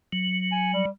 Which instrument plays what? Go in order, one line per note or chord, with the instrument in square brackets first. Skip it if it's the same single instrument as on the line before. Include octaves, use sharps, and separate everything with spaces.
[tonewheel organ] F#3
[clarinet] G#5
G3